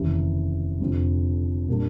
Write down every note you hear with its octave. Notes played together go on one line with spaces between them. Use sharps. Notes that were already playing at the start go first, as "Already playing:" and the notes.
Already playing: F1 D#2 C#3 E3
F1 F2 D3 F3
A#2 G3 A#3 D4